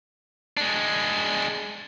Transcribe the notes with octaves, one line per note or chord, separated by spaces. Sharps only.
G#3 D4